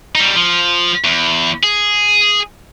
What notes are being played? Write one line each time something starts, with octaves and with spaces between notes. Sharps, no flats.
G3 D#4
F3
E2
G#4